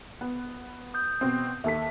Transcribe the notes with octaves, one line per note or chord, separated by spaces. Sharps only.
B3
D#6 G6
B2 C4
D#2 A4 E5 B6